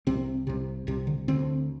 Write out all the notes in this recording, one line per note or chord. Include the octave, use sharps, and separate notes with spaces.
C2 C3 C4
C2 C3
C2 C3
D3
D2 D3 C4